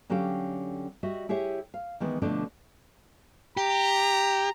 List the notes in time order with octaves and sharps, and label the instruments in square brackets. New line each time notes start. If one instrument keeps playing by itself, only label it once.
[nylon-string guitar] D3 F#3 C#4 G4 F5 G5
G3 F#4 D#5 E5
E4 G4 G#4 C#5 E5
F5
D#3 E3 G#3 B3
B2 D3 F3 A3 D4
[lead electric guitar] G4 [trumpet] A#5